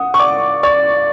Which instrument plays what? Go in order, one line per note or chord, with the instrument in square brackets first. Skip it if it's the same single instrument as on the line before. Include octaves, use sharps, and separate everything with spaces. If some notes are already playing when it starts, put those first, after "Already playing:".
Already playing: [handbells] F#5 [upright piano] D#6
[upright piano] C#6
[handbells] D5 [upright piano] D6
[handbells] D5 [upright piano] C#6